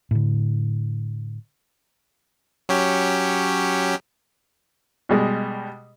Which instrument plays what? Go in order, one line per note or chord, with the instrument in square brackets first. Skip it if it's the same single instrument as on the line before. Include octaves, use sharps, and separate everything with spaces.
[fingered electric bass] A2 D3
[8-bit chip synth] F#3 C#4 G4
[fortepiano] B2 G3 G#3